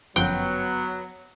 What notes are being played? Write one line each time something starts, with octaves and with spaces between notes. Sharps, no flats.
G1 F#2 F3 F#3 B3 G5